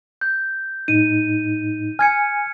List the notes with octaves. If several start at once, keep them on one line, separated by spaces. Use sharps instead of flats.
G6
A2 D#4 D#7
G#5 F6 G#6 C#7